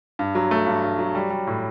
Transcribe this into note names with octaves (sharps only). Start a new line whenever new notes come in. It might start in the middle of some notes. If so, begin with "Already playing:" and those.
G2
F#3
A3
G2
G2
F#3
G3
G3
A2